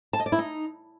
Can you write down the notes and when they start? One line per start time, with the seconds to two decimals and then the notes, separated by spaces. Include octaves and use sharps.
0.13 A5
0.20 D#5
0.26 D5
0.32 E4
0.38 D#4